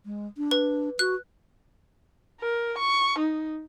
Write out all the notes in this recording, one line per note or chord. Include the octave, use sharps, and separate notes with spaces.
G#3
D4
B4
F#4 F#6
A#4
C#6
D#4